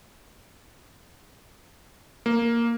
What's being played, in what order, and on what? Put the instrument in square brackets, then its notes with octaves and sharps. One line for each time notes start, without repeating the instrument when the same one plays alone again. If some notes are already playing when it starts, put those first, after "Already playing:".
[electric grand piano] A#3